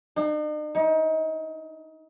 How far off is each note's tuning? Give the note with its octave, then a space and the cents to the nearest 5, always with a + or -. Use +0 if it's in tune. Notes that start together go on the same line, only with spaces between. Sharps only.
D#4 -45
D#4 +30